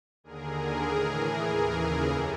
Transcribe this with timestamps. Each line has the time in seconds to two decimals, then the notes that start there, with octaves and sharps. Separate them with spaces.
0.24 D#2 D3 G#4 A#4
0.85 A2 E3
1.45 D#2 C#3 E3
2.05 F2 G4 A4